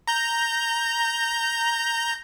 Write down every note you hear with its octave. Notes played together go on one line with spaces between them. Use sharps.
A#5 G6